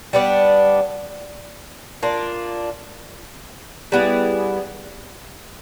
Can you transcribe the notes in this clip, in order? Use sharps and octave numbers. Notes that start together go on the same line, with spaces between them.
G3 B3 D4
A#3 D4 F4
G3 B3 E4 G#4